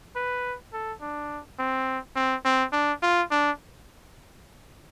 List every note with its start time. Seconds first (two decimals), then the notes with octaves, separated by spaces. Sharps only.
0.16 B4
0.73 A4
1.01 D4
1.59 C4
2.16 C4
2.45 C4
2.73 D4
3.02 F4
3.31 D4